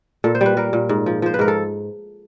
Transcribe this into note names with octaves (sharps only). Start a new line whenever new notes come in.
A#2 A4
C5
G3 B4
G3 A#4
A#2
G#2
F3
F3 C5
B4
G#2 A#4
A4